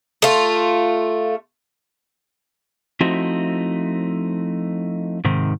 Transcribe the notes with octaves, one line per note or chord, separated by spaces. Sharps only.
A3 F4
F3 A3 C4 D#4 E4 F#4
G#2 C3 D#3